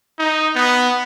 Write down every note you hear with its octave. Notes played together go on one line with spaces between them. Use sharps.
D#4
B3